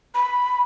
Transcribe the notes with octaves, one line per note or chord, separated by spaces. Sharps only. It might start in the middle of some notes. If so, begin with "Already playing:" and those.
B5